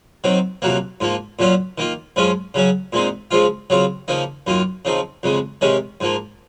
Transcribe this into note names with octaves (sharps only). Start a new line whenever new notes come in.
D#3 F#3 C4
F2 C3 F#3 A#3
G#2 F3 A#3
A#2 F#3 C#4 F4
D#3 A#3 F4
F#2 F3 G#3 C#4 F4
C#3 F#3 C#4
A#2 G#3 C4 D#4
C#3 F3 G#3 C4 F4
C#3 F#3 C4 F4
C#3 F3 A#3 D#4
F#2 D#3 A#3 F4
C#3 F3 C4 D#4
F2 C#3 G#3
C3 D#3 G#3 C#4
G#2 F3 A#3